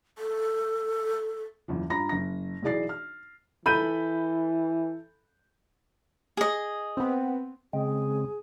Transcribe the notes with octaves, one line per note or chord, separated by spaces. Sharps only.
A4
F#1 E2 F3
G2 F4 A#5 B5 A#6
F#1 A#6
B1 E3 G#4 D5 A6 C7
F6
E3 A4 B5 G6 D#7
G#4 D#5
B3 C4
C#3 G#3 C4 G#4